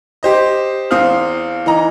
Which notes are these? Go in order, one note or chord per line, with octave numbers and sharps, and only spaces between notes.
G4 C5 D#5
E2 C4 F5 D#6 F6
E3 D#4 A#5